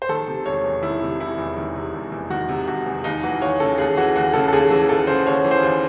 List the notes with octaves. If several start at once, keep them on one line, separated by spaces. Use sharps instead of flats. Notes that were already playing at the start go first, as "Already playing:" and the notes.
C5
D#3 A4
C3
E1 C#5
E2
D#3 E4
C3
E1 E4
E2
D#3
C3
E1
E2
D#3 F#4
C3
E1 F#4
E2
D#2 D#4
E3 F#4
D#2 C#5
C#3 A4
D#2 G#4
E3 F#4
D#2 F#4
C#3 A4
A4
D#2 G#4
E3 A4
D#2 A4
C#3 C5
D#2 C#5
E3
C5
D#2